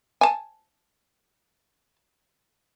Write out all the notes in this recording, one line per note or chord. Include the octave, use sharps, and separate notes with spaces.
G#5 A5